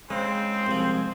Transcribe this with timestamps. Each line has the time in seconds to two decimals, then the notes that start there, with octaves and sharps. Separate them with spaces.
0.10 C#3 G#3 C4 C5
0.67 C2 F3